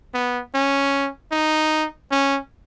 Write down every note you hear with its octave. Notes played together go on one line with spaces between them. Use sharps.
B3
C#4
D#4
C#4